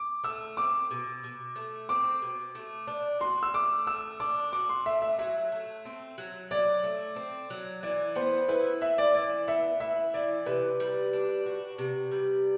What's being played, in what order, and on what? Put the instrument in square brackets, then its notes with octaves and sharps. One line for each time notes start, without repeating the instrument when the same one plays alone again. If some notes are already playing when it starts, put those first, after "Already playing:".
Already playing: [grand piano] D6
[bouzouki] A3 [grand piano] E6
[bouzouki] C4 [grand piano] D6
[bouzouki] B2
B2
A3
[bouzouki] C4 [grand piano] D6
[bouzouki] B2
A3
D4
[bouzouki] F#4 [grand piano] C6
[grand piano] E6
[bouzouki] A3 [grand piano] D6
[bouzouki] A3 [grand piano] E6
[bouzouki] D4 [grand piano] D6
[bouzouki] F#4 [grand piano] D6
[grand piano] C6
[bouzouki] A3 [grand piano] E5
[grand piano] E5
[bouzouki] F#3 [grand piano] E5
[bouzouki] A3
C4
F#3
[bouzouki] F#3 [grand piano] D5
[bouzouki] A3
C4
F#3
[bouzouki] E3 [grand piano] D5
[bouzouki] B3 [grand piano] C5
[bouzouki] E4 [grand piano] B4
[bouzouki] E3 [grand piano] E5
[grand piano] D5
[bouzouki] E3 [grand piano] D5
[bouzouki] B3 [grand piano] E5
[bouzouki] E4 [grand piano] E5
[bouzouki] E3 [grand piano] D5
[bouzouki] C3 [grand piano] B4
[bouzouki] G3
D4
F#4
C3
G3